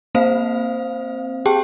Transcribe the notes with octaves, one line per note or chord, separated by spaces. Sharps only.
A#3 C4 C5 F5
G4 G#4 G5 A5